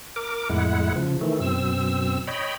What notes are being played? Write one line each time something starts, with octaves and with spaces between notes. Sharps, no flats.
A#4 D6
F2 A2 G#3 E4 F#5
C#3 F3
D#3 E3 A3
F#2 B2 C4 E6
C#5 D#5 G5 B5